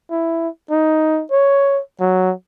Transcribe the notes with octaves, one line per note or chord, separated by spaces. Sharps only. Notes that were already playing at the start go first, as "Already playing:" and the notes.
E4
D#4
C#5
F#3